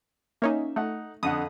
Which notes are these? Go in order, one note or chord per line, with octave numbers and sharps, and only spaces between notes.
A#3 C#4 D#4 E5
A3 D#4 F#5
F2 D3 F#5 D#6